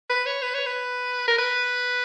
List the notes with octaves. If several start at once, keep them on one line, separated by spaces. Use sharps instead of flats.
B4
C#5
B4
C#5
B4
A#4
B4